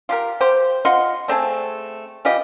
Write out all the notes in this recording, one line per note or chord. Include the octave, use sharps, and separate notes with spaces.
F4 G4 A#4
G4 C5
F4 D#5 F#5 C6
A3 C4 G#4 A5
E3 F4 G4 D#5